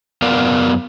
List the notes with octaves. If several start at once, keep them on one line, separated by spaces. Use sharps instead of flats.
F#2 B3 A#4 D5 F5